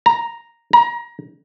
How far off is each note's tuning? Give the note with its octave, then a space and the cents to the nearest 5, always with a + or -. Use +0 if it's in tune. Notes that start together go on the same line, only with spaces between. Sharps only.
A#5 +0
A#5 +25